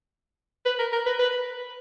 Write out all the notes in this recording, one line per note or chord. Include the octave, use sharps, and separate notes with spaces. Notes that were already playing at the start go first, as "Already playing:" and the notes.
B4
A#4
A#4
B4
B4